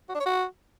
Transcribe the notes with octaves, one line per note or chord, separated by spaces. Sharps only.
F#4
D4
C#5
F#4